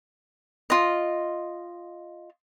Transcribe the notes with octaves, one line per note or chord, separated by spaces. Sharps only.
F4 D#5